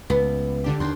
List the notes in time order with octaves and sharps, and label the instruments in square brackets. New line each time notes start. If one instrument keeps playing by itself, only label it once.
[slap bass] C#2 [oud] B3
[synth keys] D3 D4 G4
[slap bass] D#2 [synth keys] C6